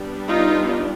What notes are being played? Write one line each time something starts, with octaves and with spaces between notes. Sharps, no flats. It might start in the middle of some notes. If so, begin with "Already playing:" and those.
Already playing: G3 B3 D4
D#4 F4